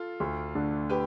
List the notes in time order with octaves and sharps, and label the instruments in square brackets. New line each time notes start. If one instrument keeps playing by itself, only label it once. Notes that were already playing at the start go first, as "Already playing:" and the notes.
Already playing: [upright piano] F4 A4
[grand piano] D2
D3 A3 D4
[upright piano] G4 B4